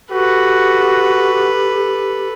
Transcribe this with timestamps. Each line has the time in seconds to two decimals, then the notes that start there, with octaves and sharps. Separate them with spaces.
0.12 F#4 G4 A4 B4